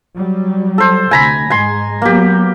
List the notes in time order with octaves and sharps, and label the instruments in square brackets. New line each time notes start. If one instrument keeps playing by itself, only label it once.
[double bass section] F#3 G3
[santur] A4 C5
[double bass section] D2 C3 [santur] G#5 A#5 B5
[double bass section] G#2 G#3 [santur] G#5 C6
[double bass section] F#3 B3 [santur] A#3 G4